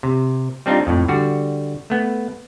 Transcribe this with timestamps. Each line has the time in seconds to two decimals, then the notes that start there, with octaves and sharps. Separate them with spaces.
0.03 C3
0.66 G3 C4 D4 D#4 F4
0.87 F2 A2
1.08 D3 G3 F#4
1.90 A3 B3